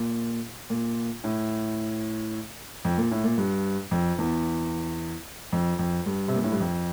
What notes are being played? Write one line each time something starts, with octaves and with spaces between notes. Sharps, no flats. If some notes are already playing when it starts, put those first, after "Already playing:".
Already playing: A#2
A#2
A2
F2
A#2
A2
A#2
G2
F2
E2
F2
F2
G2
C3
A#2
A2
G2
F2